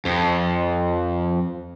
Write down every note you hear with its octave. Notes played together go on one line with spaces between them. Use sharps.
F2